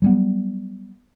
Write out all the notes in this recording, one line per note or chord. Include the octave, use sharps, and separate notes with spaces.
F#3 G3 B3